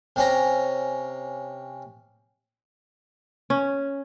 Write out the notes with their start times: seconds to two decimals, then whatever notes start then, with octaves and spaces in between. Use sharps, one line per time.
0.16 C3 C#4 A#5
3.50 C#4